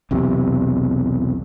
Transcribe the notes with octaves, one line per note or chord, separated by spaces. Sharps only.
B1 E2 C3